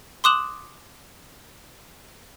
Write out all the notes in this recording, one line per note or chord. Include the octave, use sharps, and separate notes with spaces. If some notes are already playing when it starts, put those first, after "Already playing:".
C6 D6 D#6 F#6 E7 F#7